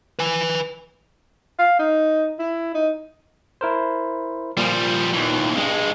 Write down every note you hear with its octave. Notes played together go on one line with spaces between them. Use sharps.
B4 G#5
F5
D#4
E4
D#4
E4 A#4 C5
A#2 F3 G3
D#2 E3
G2 G#3